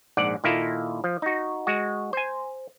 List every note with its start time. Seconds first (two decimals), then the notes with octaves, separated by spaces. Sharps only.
0.17 A#1 G#2 D5 F#5
0.44 A#2 D#3 A#3 E4 F4 A4
1.04 F3
1.22 D#4 F#4
1.67 G#3 F#4
2.13 C5 G#5